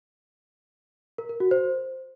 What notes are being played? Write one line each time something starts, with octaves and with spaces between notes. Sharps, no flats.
A#4
A#4
F#4
C5